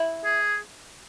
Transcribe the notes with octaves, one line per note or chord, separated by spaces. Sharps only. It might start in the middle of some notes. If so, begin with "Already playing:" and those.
Already playing: E4
G#4